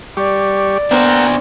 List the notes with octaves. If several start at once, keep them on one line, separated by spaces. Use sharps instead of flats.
G3 G4 D5 C#6
B3 D4 A#4 C5 F#5 G5